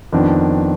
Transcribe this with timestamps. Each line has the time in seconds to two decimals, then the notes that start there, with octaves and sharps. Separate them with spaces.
0.12 F2 D#3 B3 D4